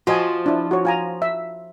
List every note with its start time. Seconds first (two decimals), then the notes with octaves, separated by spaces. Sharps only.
0.07 F3 F#4 D#5 G#5
0.46 D4 E4
0.71 F#4 C#5
0.85 F4 G#5 A#5
1.22 E5